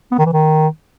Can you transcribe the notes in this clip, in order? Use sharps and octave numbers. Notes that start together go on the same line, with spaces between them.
B3
D#3
E3
D#3